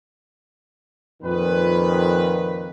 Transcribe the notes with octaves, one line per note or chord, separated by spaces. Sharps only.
F2 A#2 D#3 B4